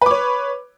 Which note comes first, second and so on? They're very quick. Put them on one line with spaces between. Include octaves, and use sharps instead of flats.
B4 D6 C#5